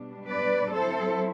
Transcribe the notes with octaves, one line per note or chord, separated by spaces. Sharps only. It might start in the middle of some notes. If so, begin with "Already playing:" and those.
Already playing: B2 G3 D4
B4 D5
F#3 C4 E4 A4 C5